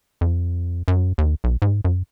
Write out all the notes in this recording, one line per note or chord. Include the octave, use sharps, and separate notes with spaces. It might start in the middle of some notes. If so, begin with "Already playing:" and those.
F2
F#2
D#2
B1
G#2
F#2